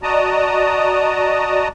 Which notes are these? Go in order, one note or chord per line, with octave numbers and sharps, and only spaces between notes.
F#4 D5 D#5 A5 A#5 D#6